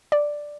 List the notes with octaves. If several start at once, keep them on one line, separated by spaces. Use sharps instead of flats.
D5